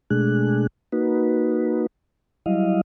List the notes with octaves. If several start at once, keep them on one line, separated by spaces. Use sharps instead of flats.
B2 G#3 A3 D4 G#4 F#6
A#3 D#4 F#4 B4
F#3 G3 E4 D#5 F5